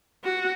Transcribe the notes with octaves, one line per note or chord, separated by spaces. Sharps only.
F#4